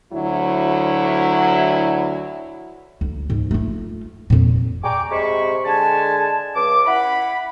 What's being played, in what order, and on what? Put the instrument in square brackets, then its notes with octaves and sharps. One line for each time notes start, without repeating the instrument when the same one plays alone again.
[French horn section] D2 F#3 E4
[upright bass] D2
G#2
A3 F4
F2 A#2
[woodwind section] D5 G5 G#5 A#5 C#6 D6
C3 G3 G#3 C5 B5 C#6
D3 G#3 G#5 A5
C#2 D6
E4 F#5 B5